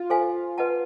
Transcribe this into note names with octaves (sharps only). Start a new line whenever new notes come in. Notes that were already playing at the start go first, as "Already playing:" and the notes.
Already playing: F4
A4 C5 F5 G#5
B4 D#5 F#5 A5